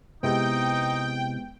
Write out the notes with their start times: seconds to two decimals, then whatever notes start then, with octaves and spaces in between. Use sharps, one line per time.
0.23 C3 G#3 B3 D#4 E4 D#5 G5